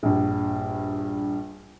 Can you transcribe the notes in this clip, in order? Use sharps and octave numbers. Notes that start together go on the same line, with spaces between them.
A#1 G2